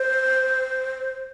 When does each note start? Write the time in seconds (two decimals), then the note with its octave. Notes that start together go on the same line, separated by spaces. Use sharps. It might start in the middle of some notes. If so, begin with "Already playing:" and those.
Already playing: C5